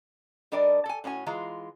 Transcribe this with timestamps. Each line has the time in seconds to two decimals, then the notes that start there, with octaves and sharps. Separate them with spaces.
0.52 G3 D4 A#4 D5 D#5
0.86 A4 G#5
1.04 A2 C#4 F#4 G#5
1.26 E3 G#3 F4 A#5